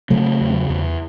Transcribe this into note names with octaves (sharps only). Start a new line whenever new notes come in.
C#3 F#3 A3
E2
E2